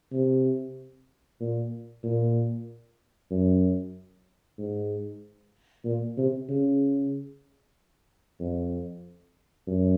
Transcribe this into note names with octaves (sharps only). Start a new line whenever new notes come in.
C3
A#2
A#2
F#2
G#2
A#2
C3
C#3
F2
F#2